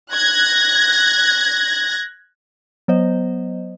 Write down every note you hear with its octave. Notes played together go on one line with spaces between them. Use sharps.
F#6 G#6 A#6
F#3 B3 C5 D#5